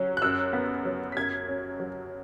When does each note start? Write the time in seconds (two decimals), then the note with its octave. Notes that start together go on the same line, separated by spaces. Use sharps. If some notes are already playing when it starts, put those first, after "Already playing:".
Already playing: F#3 C#4
0.17 F#6
0.22 F#2 E6
0.53 B3
0.85 F#3
1.12 B6
1.17 F#2 G#6
1.49 C#4
1.80 F#3